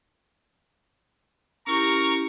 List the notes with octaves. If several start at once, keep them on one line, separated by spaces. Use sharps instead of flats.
C#4 E4 G4 A#4 A#5 C#6